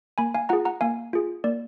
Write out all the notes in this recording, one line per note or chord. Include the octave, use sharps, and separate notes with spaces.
A#3 G#5 B5
F5 G#5
F4 G#4 F#5 A#5
F#5 A#5
A#3 F5 G#5
F4 G#4
A#3 D5